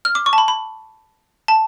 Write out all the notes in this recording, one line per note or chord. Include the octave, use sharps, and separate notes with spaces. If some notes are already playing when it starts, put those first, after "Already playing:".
F6
D6
C#6
A5
B5
B5
A5